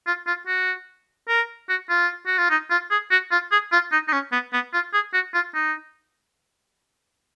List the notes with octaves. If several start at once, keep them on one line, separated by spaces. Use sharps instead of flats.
F4
F4
F#4
A#4
F#4
F4
F#4
F4
D#4
F4
G#4
F#4
F4
G#4
F4
D#4
D#4
C#4
B3
B3
F4
G#4
F#4
F4
D#4